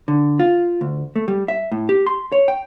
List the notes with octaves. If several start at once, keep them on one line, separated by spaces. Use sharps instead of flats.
D3
F4
D2
A3
G3
E5
A2
G4
C6
C#5
G5